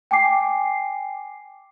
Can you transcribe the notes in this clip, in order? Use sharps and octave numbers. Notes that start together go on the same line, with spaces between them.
G5 G#5 D6 C7